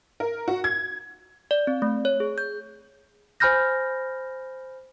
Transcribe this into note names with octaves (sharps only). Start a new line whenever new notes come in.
A#4
F#4
G#6
D5
C4
A3
C#5
G#4
G6
C5 G#5 B5 F6 G6 A#6